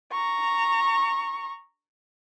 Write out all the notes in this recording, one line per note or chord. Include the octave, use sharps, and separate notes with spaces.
A#5 C#6